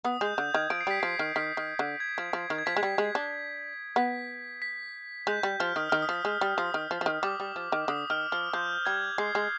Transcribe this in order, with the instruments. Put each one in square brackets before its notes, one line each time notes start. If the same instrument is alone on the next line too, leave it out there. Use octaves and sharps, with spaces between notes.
[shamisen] B3 [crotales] D#6
[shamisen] G#3 [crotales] G6
[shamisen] D3 [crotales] G6
[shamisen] D#3 [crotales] G#6
[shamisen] F3 [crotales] D7
[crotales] C7
[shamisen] G3 [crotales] B6
[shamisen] F3 [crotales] C7
[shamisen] D#3
[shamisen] D#3 [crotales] B6
[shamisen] D#3
D3
[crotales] G#6
[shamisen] F3
F3
D#3
[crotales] G#6
[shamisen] F3 [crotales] B6
[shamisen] G#3
G3
G#3
D4
[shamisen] B3 [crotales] B6
[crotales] B6
[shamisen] G#3 [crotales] G6
[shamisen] G3
[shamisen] F3 [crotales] F6
[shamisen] D#3 [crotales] D#6
[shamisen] D#3 [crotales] F6
[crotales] D#6
[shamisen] F3
G#3
G3
[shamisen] F3 [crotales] D#6
[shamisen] D#3
F3
F3
D#3
[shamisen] G3 [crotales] D6
[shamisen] G3
F3
D#3
[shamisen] D3 [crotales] D#6
[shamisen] D#3 [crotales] F6
[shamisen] F3 [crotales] F6
[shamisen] F3 [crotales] G6
[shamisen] G3 [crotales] G#6
[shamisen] G#3 [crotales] C7
[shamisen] G#3